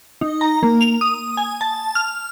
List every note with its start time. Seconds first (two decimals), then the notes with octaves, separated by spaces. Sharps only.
0.21 D#4
0.41 A#5
0.63 A#3
0.81 F7
1.01 D#6
1.37 G#5
1.61 A5
1.95 F6